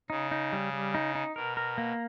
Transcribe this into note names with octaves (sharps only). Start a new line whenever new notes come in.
C#3 D#4
D#4
G3
G3
D#4
D#4
B2 A#4
A#4
A#3